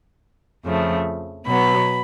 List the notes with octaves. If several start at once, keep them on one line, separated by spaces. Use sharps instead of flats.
F2 C#3 F3 A3
B2 F#3 B3 B5